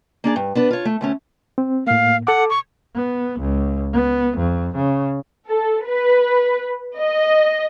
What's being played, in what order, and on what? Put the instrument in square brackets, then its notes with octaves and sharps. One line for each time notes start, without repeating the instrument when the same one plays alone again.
[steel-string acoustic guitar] A#3 D4 G#4 D5
G2
B3 D4 B4
F4 C#5
A3
D2 A3 C#4
[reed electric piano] C4
[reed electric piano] A2 A#3 [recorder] F5
[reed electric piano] A4 D6 [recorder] F#5
[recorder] C#6
[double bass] B3
C#2
B3
F2
C#3
[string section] A4
B4
D#5